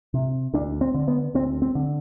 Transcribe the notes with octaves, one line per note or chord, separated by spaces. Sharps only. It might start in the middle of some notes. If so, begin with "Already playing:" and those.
C3
D2 D4
C4
D3
B3
D2 C4
C4
D3